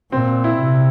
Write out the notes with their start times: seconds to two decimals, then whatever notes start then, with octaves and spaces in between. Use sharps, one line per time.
0.12 A#2 C4
0.44 E4
0.60 C3